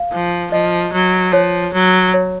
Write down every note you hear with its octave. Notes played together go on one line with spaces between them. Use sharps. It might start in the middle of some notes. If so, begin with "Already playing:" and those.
Already playing: F5
F3
F3 D#5
F#3
F3 C#5
F#3
C#5